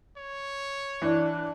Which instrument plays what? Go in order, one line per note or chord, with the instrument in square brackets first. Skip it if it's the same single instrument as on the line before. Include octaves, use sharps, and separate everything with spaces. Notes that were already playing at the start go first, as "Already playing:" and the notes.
[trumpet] C#5
[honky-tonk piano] E3 [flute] D4